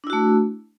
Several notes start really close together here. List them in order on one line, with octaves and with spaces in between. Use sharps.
D4 E4 F#4 A3